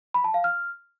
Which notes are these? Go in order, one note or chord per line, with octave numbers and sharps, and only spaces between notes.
B5
A5
F5
F6